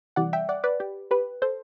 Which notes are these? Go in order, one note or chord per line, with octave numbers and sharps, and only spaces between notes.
C3 E3 G3 D5 F#5
E5 G5
D5 F#5
B4 D5
G4
G4 B4
A4 C5